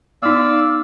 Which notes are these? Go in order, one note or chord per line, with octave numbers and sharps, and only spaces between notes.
B3 D#4 D5 F5 E6